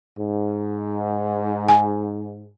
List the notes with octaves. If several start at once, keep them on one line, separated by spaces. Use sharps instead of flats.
G#2
G#5